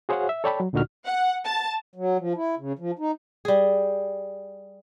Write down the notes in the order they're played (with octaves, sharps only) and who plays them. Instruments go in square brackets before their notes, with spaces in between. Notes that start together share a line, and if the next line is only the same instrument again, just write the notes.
[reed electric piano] F#4 G#4 C5 C#5 F5 F#5
E5
A4 C#5 D5 G5 A5 B5
F#3
D2 A#2 D3 D#4 F#4 F6
[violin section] F#5
A5
[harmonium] F#3
F3
E4
C#3
F3
D#4
[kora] G3 G#4